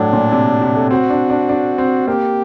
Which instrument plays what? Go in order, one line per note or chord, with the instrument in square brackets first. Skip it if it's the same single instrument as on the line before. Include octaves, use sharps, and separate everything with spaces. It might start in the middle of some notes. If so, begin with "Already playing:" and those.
Already playing: [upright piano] A2 F#3 [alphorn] D4
[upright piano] A#2
C3
C3
A3
[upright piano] C4 [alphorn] F#4
[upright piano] D4
D4
D4
C4
[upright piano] A#3 [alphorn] G4